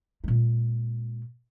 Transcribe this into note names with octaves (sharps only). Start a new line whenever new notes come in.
A#2 G#3